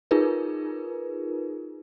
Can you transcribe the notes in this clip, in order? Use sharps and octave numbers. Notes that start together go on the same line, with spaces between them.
D#4 F4 G#4 A#4 B4